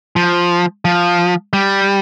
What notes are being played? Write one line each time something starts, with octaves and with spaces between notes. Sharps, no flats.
F3
F3
G3